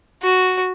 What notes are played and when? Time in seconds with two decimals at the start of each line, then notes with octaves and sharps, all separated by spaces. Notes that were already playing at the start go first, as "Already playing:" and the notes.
0.23 F#4